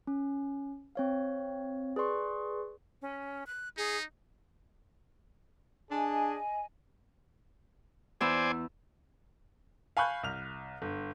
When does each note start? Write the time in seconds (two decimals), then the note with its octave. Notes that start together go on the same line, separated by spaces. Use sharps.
0.07 C#4
0.95 C4 C#5 F5
1.96 G#4 B4 D5 C6 C#6
3.02 C#4
3.47 F#6
3.77 D#4 G#4
5.91 D4 G#4 D#5 G#5
8.21 E2 E4 C5 D5 G#5 E6
9.97 F5 G#5 B5 C#6 F#6 G6
10.23 C2 F6 F7
10.82 G1